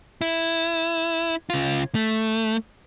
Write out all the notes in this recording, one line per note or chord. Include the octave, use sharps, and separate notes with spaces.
E4
C#3 F4
A3